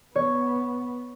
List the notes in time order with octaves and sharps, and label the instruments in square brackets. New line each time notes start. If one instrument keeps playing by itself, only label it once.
[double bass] B3 [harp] C#5